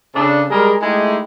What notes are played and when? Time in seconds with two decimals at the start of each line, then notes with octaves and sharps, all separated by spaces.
0.15 C#3 D4 A4
0.51 G3 G#3 G#4 A#4
0.82 G#3 A3 D#4 E4 G4 G#4